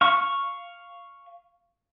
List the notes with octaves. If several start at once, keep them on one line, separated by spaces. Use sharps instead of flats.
F5 C#6